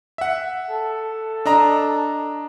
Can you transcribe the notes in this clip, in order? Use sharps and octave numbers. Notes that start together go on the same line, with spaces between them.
E5 F#5
A4
D4 D#5 A#5